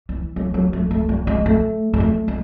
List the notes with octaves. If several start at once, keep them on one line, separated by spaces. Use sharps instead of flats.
E3
F#3
F#3
A3
A3
G3
G#3
A3
G#3
A3
G#3